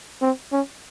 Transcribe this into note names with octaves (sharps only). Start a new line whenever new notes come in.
C4
C#4